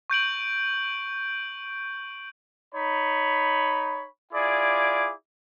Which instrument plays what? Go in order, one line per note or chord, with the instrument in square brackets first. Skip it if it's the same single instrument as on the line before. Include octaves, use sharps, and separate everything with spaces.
[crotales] C#6 G6 D7 F#7
[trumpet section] D#4 C#5 B5
E4 F4 G#4 D5 D6